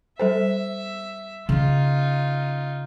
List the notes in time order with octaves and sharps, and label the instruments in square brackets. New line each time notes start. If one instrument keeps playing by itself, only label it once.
[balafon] G3 A4 C5 [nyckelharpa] E5
[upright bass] C#3 C#4 [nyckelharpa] D#4 F4